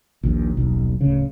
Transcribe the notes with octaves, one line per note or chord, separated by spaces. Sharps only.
A#1 D#2
D#1 B1
D1 C#3